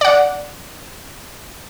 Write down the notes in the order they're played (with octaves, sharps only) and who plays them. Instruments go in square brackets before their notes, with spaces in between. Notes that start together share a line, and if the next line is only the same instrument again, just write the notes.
[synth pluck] D5 F#5